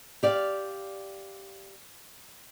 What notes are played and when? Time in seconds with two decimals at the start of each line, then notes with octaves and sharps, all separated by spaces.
0.23 G4 D5 F5